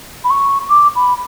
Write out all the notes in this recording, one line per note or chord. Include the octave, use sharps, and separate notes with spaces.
B5
C#6
D6
B5